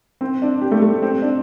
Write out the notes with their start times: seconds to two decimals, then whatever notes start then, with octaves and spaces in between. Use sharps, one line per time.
0.21 C4
0.42 D4
0.62 G4
0.71 A3
0.82 A3
1.02 C4
1.22 D4